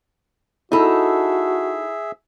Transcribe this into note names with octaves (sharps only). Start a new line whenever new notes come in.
D#4 E4 F#4 G#4 A4 E5 B5